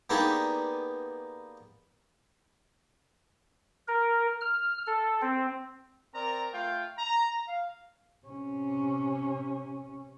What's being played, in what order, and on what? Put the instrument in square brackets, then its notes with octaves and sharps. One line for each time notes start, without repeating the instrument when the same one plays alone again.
[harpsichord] A#3 B3 D4 D#4 G4 G#4
[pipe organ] A#4
F6
A4
C4
[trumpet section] C4 A#4 D5 A#5
A3 F4 F5 G5
A#5
F5
[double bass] C3 C#4